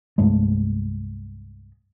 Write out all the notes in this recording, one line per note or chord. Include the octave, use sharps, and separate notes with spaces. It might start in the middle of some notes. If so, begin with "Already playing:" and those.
C2 G2 G#3 A3